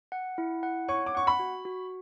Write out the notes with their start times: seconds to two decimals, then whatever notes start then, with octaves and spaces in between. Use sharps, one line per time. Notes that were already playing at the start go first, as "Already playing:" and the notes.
0.12 F#5
0.38 E4
0.63 F#5
0.88 C#5 C#6
1.06 D6
1.15 F#5 C#6
1.27 B5
1.39 F#4
1.65 F#4